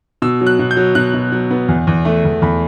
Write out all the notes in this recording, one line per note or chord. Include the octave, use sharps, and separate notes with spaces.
B2 E6
F#3
F#6
B2
G6
F#3
B2 F#6
B2
F#3
B3
E2
E2
A3
E2
E2 B5